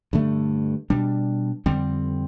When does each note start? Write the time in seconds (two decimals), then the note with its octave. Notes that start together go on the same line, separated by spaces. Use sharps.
0.13 G2 D3 A3
0.90 B2 G3 D4
1.66 F2 D3 G3 C4